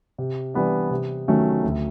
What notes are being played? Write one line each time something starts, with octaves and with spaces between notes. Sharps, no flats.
C3
E3 G3 B3 D4
C3
D#3 F#3 A3 C#4
D2